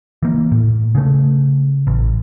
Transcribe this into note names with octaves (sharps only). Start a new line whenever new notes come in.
E3 A#3
A2
C#3 A3
A1